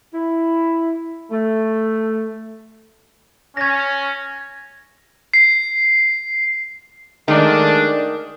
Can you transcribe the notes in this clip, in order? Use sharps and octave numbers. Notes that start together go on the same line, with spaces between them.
E4
A3
C#4 G#6 A#6
C7
D#3 G#3 A3 D4